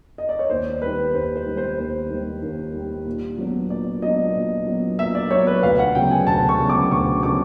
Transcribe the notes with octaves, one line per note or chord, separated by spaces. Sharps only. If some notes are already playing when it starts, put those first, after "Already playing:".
D#5
D5
C#5
D#2 C5
D#3 G3 B4
D#2 C5
C5
D#3 G3
C5
D#2 C5
D#3 G3
D#2
D#3 G3
A#2
F#3 B3 D4
A#2 D5
F#3 B3 D4 D#5
A#2
F#3 B3 D4
A#2 E5
D5
F#3 B3 D4 C#5
B4
D2 F5
F#5
C#3 F#3 B3 D4 G5
G#5
D2 A5
C#6
C#3 F#3 B3 D4
D6
D2 C#6
C#3 F#3 B3 D4 D6